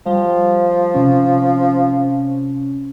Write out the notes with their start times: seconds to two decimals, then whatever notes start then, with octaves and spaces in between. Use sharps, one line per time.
0.06 F3 G3
0.94 C3 C#4